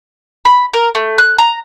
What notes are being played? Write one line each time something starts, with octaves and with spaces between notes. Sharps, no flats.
B5
A#4
A3
F#6
A#5